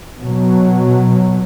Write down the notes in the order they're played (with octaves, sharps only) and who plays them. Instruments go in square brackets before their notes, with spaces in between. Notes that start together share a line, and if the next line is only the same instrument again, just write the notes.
[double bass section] B2 F#3